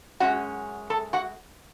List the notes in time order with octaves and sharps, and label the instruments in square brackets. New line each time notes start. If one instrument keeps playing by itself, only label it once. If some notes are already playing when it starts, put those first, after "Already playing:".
[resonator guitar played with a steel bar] F#2 E3 G#3 C#4 F#4 F#5
A4 A5
F#4 F#5